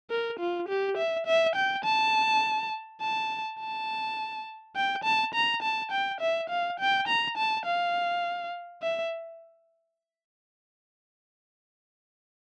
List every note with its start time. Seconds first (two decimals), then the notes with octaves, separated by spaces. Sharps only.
0.11 A#4
0.40 F4
0.69 G4
0.97 E5
1.27 E5
1.56 G5
1.85 A5
3.01 A5
3.60 A5
4.76 G5
5.04 A5
5.34 A#5
5.63 A5
5.92 G5
6.21 E5
6.50 F5
6.80 G5
7.08 A#5
7.37 A5
7.66 F5
8.82 E5